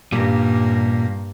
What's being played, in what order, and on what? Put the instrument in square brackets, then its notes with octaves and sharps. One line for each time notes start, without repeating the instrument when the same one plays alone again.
[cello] G2 A#3 [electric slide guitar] A#2 G3